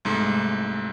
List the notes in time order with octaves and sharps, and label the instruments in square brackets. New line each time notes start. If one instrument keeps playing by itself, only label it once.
[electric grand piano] C2 G#2 G#3 A3